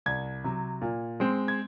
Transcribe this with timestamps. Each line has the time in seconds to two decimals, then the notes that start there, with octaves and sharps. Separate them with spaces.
0.06 C2 G#6
0.44 C3 F#3
0.81 A#2
1.20 G#3 C4
1.48 G#6